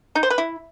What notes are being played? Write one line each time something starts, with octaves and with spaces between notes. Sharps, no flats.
D#4
C5
B4
E4